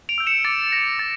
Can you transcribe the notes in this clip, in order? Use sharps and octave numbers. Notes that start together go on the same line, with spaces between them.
D7 F7
E6 G6
C#7 E7
D6 A6 C#7
G6 A#6
D6 A6